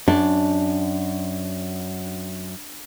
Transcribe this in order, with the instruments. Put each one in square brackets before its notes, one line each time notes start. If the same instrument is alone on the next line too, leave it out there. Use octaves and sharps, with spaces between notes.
[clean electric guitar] F#2 [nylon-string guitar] D4